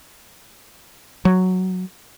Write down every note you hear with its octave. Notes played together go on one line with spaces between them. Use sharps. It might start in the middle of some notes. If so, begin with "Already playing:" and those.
F#3